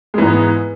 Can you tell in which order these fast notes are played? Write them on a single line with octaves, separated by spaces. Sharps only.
G#3 E3 G#2 B3